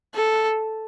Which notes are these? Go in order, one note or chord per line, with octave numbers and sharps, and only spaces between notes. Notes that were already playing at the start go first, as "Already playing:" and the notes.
A4